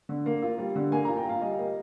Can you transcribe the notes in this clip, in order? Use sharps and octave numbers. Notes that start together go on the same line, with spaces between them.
D3
A#3
F4
G3
D3
A#3 G#5
F4 A#5
G5
F4 F5
G3 D#5
A#3 D#5